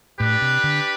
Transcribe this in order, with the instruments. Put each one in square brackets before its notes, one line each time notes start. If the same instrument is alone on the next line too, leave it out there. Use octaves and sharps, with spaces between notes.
[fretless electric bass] A2 [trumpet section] D4 G4 B4
[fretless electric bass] C3
D3